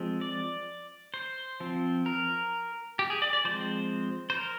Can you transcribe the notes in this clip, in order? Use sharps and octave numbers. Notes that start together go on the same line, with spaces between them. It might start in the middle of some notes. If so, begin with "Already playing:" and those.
Already playing: F3 G#3 C4
D5
C5
F3 C4
A#4
G4
G#4
D5
D5
F3 G#3 C4 C5
C5
A#4